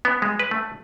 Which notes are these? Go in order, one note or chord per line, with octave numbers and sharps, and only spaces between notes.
B3
G#3
B4
A3